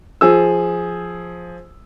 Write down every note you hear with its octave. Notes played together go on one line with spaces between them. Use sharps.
F3 G#4 E6